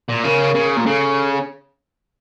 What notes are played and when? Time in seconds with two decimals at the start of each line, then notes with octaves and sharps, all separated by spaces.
0.09 A#2
0.25 C#3 A#4
0.55 C#3
0.77 A#2
0.86 C#3 A4